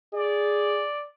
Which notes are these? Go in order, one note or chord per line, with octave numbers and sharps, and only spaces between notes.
G#4 D5